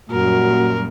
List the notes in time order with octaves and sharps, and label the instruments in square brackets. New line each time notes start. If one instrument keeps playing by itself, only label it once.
[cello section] F#2 A#2 G3 [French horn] F#4 [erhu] A#4